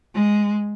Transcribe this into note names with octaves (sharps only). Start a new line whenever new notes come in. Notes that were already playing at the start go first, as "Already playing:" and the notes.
G#3